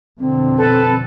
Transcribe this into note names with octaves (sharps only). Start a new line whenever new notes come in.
F2 B2 D3 C4
A4 B4